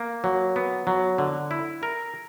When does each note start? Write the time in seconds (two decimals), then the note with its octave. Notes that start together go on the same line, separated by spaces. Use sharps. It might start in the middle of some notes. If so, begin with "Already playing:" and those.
Already playing: A#3
0.24 F#3
0.56 B3
0.87 F#3
1.18 D3
1.51 E4
1.83 A#4